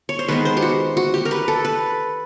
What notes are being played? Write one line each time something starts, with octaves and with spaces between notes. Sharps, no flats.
C#5
C5
D#3 G#3 B3 B4
C5
G4
F#4
F#4
G4
A#4
B4
A4
B4